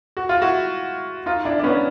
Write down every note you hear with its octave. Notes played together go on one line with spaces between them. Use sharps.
F#4
F4
E4 F#4
D#4 F4
D4 E4
D4
B3 C#4